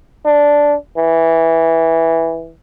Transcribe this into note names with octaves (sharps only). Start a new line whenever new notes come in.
D4
E3